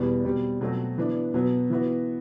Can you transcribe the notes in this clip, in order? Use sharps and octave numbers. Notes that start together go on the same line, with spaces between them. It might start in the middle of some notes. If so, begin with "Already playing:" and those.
Already playing: E2 B2 G3 B3
B2 G3 C4
B2 F#3 A3 C4 F#4
E3 B3 D4
B2 F#3 B3
E3 B3 F#4